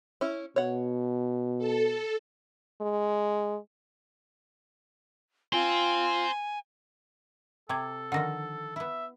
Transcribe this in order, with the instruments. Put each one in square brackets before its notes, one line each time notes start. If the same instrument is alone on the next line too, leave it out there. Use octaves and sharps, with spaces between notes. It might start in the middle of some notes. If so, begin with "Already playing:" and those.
[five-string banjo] C#4 E4
[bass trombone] B2 [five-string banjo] C#5 F#5
[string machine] A4
[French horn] G#3
[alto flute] F4 [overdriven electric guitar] C5 G5 [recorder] G#5
[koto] C3 [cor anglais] A4 [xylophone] G5 D6 G#6
[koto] D3 D#3 F3 [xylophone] F#5 A#6
[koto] B3 E4 [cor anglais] E5